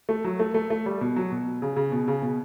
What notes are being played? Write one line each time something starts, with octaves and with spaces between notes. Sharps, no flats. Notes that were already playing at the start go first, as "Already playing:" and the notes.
A3
F#3
A3
A3
A3
G3
B2
F#3
B2
C#3
C#3
B2
C#3
B2